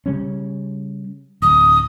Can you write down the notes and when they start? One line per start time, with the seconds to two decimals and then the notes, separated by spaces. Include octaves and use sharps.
0.06 C#3 G3 C#4
1.42 D1 D#6